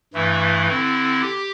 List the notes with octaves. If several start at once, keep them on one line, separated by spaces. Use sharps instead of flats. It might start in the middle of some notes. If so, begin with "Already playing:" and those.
G2 E3 A3 E4
D3 C4 E4
G4